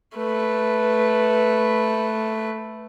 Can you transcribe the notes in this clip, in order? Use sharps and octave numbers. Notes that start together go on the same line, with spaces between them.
A3 B4